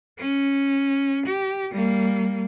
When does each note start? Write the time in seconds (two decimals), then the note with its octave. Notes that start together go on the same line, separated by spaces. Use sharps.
0.19 C#4
1.26 G4
1.72 G3 A#3